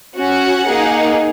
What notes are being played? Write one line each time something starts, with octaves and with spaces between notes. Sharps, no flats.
C#4 F#4 F#5
A#3 D#4 G#4